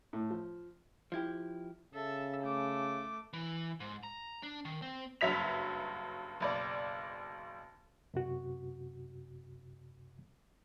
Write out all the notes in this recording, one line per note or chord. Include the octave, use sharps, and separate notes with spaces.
A2
F3
F3 E4 G4
C#3 A4 E5
A3 D6
E3
G#2
A#5
D4
D#3
C4
F#1 G2 F#3 E5 B6 F7
F#1 B1 D5
F#2 C3 F#4